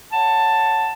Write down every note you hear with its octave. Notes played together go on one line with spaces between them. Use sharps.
C#5 F#5 A5